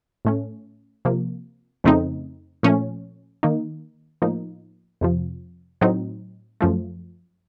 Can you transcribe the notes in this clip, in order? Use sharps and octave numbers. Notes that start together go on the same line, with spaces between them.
A2 A3 C#4
C3 F3 A#3
F2 C#3 A3 C4 D#4
A#2 F3 A3 C#4
D#3 A#3 D#4
A2 F3 A#3 D#4
F2 C3 F3
A2 F#3 C4 D#4
F#2 F3 A3